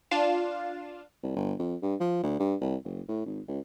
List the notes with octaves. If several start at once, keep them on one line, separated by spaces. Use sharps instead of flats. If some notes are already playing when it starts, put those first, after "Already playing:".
D4 F4 F5 E7
C2
G1
F2
G2
F3
D2
G2
C2
F#1
A2
G#1
C#2